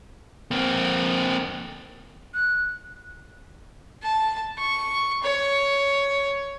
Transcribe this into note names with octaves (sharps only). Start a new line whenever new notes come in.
A#3 C4
F#6
A5
C#6
C#5